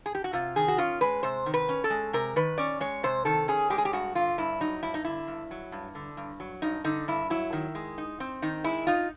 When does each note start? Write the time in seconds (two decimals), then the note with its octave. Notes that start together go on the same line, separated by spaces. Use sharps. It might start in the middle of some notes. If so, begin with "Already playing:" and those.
0.06 G#4
0.15 G4
0.24 F#4
0.33 C3 F4
0.56 D#3 G#4
0.68 F#4
0.78 C#4 F4
1.01 G#3 B4
1.23 C3 C5
1.46 D#3
1.54 B4
1.69 C#4
1.84 A4
1.90 G#3
2.13 C3 A#4
2.36 D#3 B4
2.58 C#4 D5
2.80 G#3 C#5
3.03 C3 C5
3.25 D#3 A4
3.48 C#4 G#4
3.70 G#3 G4
3.78 G#4
3.85 G4
3.93 G2 F#4
4.15 D3 F4
4.38 G2 E4
4.60 F#3 D#4
4.83 G2 E4
4.94 D#4
5.04 D3 E4
5.27 G2
5.51 F#3
5.72 G2
5.95 D3
6.17 G2
6.40 F#3
6.62 G2 D#4
6.84 D3 D#4
7.08 G2 E4
7.30 F#3 E4
7.53 D#3
7.75 G#3
7.98 D#4
8.20 C4
8.42 D#3 D#4
8.64 G#3 E4
8.87 D#4 F4